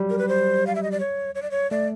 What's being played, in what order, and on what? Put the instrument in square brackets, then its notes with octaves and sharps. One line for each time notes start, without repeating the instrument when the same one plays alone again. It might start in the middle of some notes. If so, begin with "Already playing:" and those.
Already playing: [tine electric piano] F#3 G3
[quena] A#4
B4
C5
F5
E5
D#5
D5
C#5
C#5
D5
C#5
[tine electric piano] A3 [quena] D5